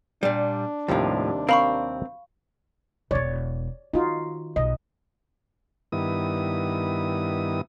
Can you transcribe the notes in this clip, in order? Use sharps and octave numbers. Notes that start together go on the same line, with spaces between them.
A#2 G3 D4
D#2 A2 C3 F3 G3
C4 A#4 F5 B5 C#6
E1 B3 C#5 D5
D#3 D#4 F4 F#4
B1 D#5
G2 D#3 B3 E4 D#6